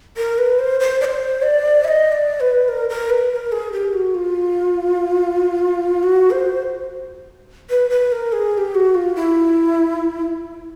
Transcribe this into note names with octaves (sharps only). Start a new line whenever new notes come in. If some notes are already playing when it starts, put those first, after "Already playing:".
A#4
B4
C5
C5
D5
C5
D5
E5
D#5
D5
B4
A#4
A#4
B4
B4
A#4
G#4
G4
F#4
F4
F#4
C5
B4
B4
A#4
G#4
G#4
G4
F#4
F4
E4